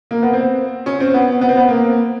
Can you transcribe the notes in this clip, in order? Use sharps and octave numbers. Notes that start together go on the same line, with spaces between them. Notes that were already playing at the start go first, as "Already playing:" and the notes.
A#3
B3
C4
C#4
C4
B3
B3
C4
B3
A#3